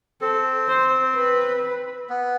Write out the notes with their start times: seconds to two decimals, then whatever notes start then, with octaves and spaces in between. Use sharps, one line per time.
0.21 C4 A4
0.68 C5
1.15 B4
2.10 B3